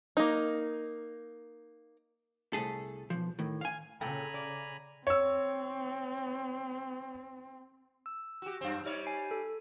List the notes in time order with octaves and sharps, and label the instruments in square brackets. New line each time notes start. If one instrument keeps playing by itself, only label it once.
[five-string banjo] A#3 D#4
[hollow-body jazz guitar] C2 A3 G#4 A4
B1 F3
A2 D#3
F5 G#5
[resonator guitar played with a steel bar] A#2 A4 G5 [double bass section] C#3 [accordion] G#5 A#5 B5
[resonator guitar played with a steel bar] D5
[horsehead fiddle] C4 [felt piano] C#5 E6
[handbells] E6
[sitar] F#4 G4
F#2 C4
G3 D#4 C#5
[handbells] G#5 C7
A4